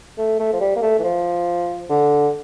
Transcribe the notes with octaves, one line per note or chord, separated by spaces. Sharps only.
A3
A3
F3
G3
A#3
A3
E3
F3
D3